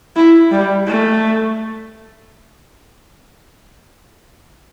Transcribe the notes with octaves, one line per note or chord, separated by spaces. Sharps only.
E4
G3
A3